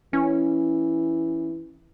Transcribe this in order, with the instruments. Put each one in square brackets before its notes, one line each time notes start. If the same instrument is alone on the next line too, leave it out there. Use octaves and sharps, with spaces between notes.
[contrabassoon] E3 [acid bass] C#4